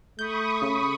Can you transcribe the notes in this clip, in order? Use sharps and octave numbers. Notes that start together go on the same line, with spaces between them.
A3 B5 C#6 D#6 G6
C#3